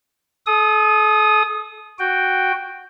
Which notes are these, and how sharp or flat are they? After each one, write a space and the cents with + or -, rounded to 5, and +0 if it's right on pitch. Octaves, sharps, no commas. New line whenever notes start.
A4 -40 D#6 +0
F#4 +0 G5 +0